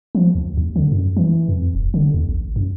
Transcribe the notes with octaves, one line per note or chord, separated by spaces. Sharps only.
F3
D2
D#2
D3
F#2
E3
F2
D#1
D3
D#2
A1
F#2